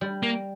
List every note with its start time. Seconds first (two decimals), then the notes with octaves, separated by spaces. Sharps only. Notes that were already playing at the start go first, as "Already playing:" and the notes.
0.01 G3
0.23 A#3